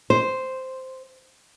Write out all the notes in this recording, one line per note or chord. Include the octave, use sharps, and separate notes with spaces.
C5